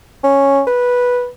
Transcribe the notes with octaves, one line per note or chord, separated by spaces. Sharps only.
C#4
B4